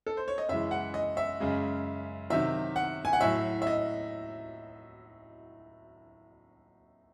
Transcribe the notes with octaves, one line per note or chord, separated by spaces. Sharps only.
A4
C5
C#5
D#5
F#2 C#3 E3 G#3 E5
F#5
D#5
E5
F#2 C#3 G#3
C3 D#3 F#3 E5
F#5
G#5
F#5
A2 F#3 E5
E5
D#5